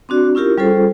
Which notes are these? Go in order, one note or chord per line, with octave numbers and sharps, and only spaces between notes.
C4 D4 F#4 D5
C#4 E4 F4 G4 A#4
G3 C#4 F4 G#4 A4 C5